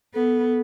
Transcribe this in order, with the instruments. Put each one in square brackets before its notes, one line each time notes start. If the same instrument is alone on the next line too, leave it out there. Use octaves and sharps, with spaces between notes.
[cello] B3 [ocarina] A4